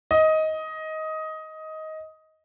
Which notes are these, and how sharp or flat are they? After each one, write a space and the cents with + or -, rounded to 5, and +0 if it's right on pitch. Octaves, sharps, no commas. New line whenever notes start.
D#5 +15